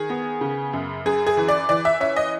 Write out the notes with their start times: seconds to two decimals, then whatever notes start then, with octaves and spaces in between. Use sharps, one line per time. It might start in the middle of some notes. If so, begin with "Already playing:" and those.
Already playing: D#3 G#4
0.10 B3
0.41 C#3
0.73 F#2
1.05 F#2 G#4
1.27 G#4
1.37 E3
1.48 D5
1.69 E3 D5
1.85 E5
2.00 C#4 E5
2.16 D#5